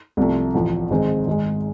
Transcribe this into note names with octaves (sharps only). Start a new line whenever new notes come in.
C2 C3 F3 A3
A1 A2 F3
G#1 G#2 G#3 C4
G#1 G#2 G#3